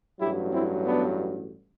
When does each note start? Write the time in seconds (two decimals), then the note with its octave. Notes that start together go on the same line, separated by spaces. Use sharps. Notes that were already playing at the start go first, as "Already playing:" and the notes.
0.20 A1 G2 F#3 E4 G4
0.53 C4 E4
0.86 B3 D4